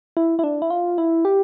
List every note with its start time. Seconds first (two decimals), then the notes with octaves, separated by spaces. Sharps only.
0.17 E4
0.39 E4
0.44 D4
0.62 E4
0.70 F4
0.98 E4
1.25 G4